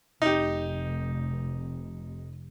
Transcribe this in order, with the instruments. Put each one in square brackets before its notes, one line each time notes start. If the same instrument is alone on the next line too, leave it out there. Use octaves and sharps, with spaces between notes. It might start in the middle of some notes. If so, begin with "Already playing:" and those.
[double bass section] F1 [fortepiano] D#4 G4